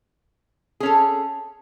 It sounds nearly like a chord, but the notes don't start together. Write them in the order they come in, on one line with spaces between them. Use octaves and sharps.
G#4 C#4 A4